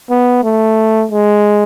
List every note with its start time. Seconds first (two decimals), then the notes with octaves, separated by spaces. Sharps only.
0.10 B3
0.44 A3
1.11 G#3